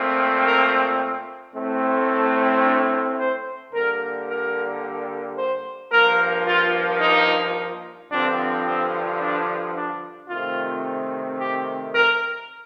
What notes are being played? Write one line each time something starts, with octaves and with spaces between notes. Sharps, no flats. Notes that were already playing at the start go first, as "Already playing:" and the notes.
Already playing: A#2 A3 C4
A#4
A2 A3 C4
A4
D4
C5
D3 G3 A#3 A#4
A#4
C5
G2 F3 A#3 A#4
F4
D#4
G2 D3 F3 C4 D4
C4
D4
D4
C3 D#3 A3 C4 F4
G4
A#4